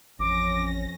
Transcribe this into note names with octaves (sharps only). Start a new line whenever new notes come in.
A1 F2 C#4 D6 A#6